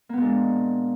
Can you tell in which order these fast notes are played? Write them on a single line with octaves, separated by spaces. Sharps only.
A#3 B3 A#2 G#3 D4